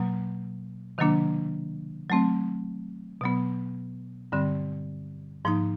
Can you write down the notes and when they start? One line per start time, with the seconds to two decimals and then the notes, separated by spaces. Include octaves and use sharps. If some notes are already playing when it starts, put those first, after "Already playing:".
Already playing: B2 F#3 A#3
0.98 C3 D#3 F#3 A#3 D4
2.10 F#3 A3 C4
3.21 B2 F#3 B3
4.32 G2 D3 G3 C4
5.45 G#2 F3 A#3 D#4